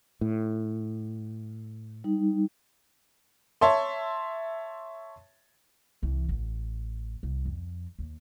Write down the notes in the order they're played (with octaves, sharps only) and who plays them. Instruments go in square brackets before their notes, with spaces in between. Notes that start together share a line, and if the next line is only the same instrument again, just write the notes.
[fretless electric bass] A2
[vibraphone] G3 D#4
[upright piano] C#5 E5 A5 C6
[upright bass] C2 E3
A1
C2
F2
D#2